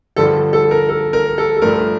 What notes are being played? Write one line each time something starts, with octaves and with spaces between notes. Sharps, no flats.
G2 D3 F3 A4
A4
A#4
A4
A#4
A4
A4
G2 F3 A3 A#4